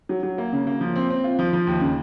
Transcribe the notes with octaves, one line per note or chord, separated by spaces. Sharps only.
F#3
F#3
A#3
C#3
A#3
F3
C4
C4
F4
F3
F3
D#2
C#3